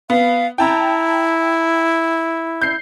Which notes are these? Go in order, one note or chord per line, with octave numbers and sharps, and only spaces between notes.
B3 F5
E4 G5 A5 A#5
G6 C7